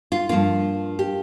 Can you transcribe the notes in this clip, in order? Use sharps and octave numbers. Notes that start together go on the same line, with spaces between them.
F4
G2 F3 A#3 F4
G4